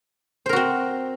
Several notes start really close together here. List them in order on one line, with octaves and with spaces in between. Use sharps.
C5 A#4 F#4 C4